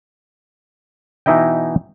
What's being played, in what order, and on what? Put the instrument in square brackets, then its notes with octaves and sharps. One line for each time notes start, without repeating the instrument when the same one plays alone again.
[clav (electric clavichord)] B2 E3 D#4 E4 D#5 G5